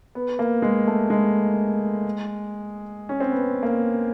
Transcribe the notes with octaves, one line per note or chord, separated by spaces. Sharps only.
B3
A#3
G#3
A3
G#3
C#4
C4
B3
A#3